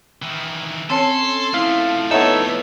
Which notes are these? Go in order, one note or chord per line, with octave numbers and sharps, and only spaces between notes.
D#3 E3
C4 C#4 A4 C#5 A5 C6
F3 A3 E4 F5
B3 D#4 A4 C#5 E5 F#5 E6